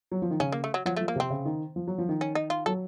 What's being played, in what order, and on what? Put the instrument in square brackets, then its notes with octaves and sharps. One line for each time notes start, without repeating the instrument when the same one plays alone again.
[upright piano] F#3
F3
D#3
[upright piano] C#3 [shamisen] C#4
[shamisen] A#3
A3
F#3
[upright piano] F3 [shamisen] F#3
[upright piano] F3 [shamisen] A3
[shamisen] A#3
[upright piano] C3 [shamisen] C4
[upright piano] C#3
D#3
F3
F#3
F3
D#3
[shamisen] C#4
D#4
F4
[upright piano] F#3 [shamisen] A4